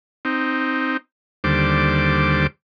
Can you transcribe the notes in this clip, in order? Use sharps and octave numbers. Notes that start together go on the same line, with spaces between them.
C4 D#4
D#2 D3 G3 C5 D6